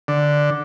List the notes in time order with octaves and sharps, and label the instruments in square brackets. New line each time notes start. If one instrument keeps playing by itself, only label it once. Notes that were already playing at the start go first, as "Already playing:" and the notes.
[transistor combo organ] D3